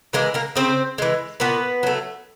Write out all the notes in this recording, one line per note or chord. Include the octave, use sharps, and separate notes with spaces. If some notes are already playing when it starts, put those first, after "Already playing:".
E3 G#3 A#3 A#4
A#3 A#4
C#3 C4 C5
E3 G#3
A#2 B3 B4
F#3 A3